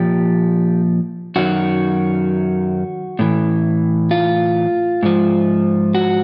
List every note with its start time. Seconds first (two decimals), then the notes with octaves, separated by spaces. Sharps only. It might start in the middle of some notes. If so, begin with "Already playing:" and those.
Already playing: A#2 F3 G4
1.36 F#2 D#3 F#3 F#4
3.19 A2 E3
4.11 F4
5.03 G#2 F3
5.95 F#4